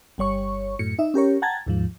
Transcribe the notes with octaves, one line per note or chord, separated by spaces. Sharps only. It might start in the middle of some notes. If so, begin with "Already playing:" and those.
G1 G3 C#5 C#6
F#2 A2 C#7
D#4 E5
C#4 G4 A#4 C#5
F#5 G5 A5 A#5 G#6 A6
D#2 G#2 F3